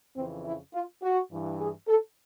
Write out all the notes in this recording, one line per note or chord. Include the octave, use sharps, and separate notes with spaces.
F2 C#3 E3 C4
E4
F4
F#4
G2 E3
G#4
A4